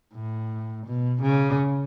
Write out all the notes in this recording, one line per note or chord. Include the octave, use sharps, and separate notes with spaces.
A2
B2
C#3